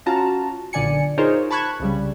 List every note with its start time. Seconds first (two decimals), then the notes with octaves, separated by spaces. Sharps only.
0.06 C#4 F4 F#4 A5 A#5
0.73 B1 A#2 D3 D5 G#5 C#7
1.18 D#4 F4 G#4 A#4 C5 C#5
1.50 A5 B5 C#6 F#6 G#6
1.80 C2 C#3 G3